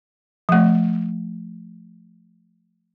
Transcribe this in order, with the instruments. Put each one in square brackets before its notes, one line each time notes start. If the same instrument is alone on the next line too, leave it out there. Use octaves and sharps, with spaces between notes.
[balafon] F3 A3